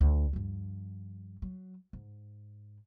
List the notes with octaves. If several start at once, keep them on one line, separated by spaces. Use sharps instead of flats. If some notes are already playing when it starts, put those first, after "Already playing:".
D2
G2 F3
F#3
G#2